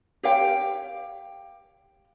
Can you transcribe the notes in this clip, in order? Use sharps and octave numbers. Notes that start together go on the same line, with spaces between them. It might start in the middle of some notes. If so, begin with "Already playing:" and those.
G4 C#5 F5 G5